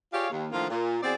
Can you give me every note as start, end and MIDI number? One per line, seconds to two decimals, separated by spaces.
0.13 0.27 65
0.13 0.27 67
0.13 0.27 68
0.13 0.27 73
0.13 0.27 74
0.13 0.27 77
0.30 0.48 39
0.52 0.67 45
0.52 0.67 50
0.52 0.67 51
0.52 0.67 53
0.52 0.67 58
0.52 0.67 65
0.70 0.98 46
1.03 1.15 40
1.03 1.15 60
1.03 1.15 66
1.03 1.15 68
1.03 1.15 74